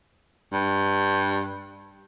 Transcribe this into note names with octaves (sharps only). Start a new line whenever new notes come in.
G2